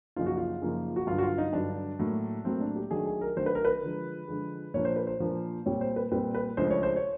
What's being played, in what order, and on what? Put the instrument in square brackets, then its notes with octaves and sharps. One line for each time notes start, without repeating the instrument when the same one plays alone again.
[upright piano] F#2 C#3 F3 A#3 D#4 [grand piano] F4
[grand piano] F#4
F4
[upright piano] F#2 C#3 F3 A#3 D#4
[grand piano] F#4
[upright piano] G2 D3 F#3 [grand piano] F4
[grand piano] F#4
F4
D#4
[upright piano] G2 D3 F#3 [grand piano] D4
[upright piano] A2 F#3 A#3
[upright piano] A2 F#3 A#3 [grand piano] C4
[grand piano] D4
G4
[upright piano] D#3 F#3 A3 D4 [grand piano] G#4
[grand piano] G#4
A#4
[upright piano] D#3 F#3 A3 D4 [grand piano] C5
[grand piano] B4
A#4
B4
[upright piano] D3 F3 G#3
D3 F3 G#3
[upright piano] A#2 F3 A#3 D4 [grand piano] C#5
[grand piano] C5
B4
C5
[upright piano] A#2 F3 A#3 D4
[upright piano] A#2 G3 C4 [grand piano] C#5
[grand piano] C5
B4
[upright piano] A#2 G3 C4 [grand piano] B4
[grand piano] B4
[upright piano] C#2 C#3 F3 A3 D4 [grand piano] C5
[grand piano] C#5
C5
C#5